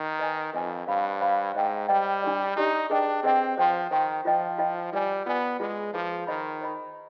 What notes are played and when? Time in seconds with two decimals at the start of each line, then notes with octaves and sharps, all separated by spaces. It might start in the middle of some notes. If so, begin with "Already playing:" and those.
Already playing: D#3
0.19 B4 D#5 G#5
0.53 F2 B4 D#5 G#5
0.87 G2 C5 F5 B5
1.20 C5 F5 B5
1.55 G#2 C5 D#5 G5
1.88 G3 C5 D#5 G5
2.22 D4 G4 D5
2.56 D4 D#4 G4 D5
2.90 D4 G#4 B4 D#5 G5
3.23 C4 G#4 B4 D#5 G5
3.58 F3 C5 G5 C6
3.91 D#3 C5 G5 C6
4.25 F3 F4 C5 D#5 G5
4.58 F4 C5 D#5 G5
4.93 G3 F4 B4 D5 G#5
5.26 B3 F4 B4 D5 G#5
5.60 G#3 F4 G#4 B4
5.93 F3 F4 G#4 B4
6.27 D#3 C5 D#5 B5
6.61 C5 D#5 B5